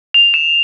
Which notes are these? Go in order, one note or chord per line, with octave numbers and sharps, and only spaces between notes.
F7
E7